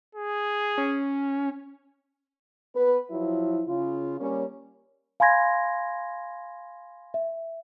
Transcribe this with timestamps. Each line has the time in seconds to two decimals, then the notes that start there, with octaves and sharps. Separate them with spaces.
0.15 G#4
0.78 C#4
2.75 B3 B4
3.10 F3 F#3 E4
3.67 C#3 F4
4.19 G3 A#3 C#4
5.20 F5 G#5 B5 C6 G#6 A#6
7.14 E5